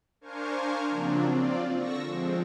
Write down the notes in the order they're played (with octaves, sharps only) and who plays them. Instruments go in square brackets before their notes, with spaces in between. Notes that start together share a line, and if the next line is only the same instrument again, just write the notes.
[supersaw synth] D4 A#4 C5 F5 G#5 C#6
C#3 F3 F#3 A#3 C4 D4
C4 F4 D5
D3 C#6 E6 A#6
F3 G#3 C4